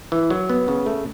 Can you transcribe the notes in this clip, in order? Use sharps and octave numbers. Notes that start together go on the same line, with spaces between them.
E3
F#3
B3
C#3
A3